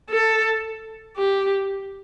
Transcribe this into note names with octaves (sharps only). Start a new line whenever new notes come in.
A4
G4